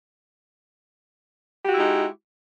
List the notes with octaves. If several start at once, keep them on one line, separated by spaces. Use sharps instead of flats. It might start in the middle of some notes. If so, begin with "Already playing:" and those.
G#3 D#4 E4 F#4 G4